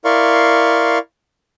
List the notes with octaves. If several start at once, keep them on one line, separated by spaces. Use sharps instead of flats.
E4 A#4 D5 F5 C6 C#6